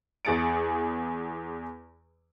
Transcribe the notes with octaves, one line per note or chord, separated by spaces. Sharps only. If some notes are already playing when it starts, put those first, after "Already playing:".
E2 G#4 A6 C#7 D7